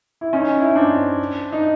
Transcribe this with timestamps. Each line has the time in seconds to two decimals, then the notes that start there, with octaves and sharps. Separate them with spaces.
0.21 E4
0.33 C#4 D#4
0.60 E4
0.68 D#4
0.75 C4 D4
1.52 D#4